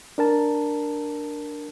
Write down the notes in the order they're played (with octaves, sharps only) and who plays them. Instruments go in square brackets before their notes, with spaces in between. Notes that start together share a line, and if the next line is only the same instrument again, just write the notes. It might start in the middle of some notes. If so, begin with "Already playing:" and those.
[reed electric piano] D4 A#4 A5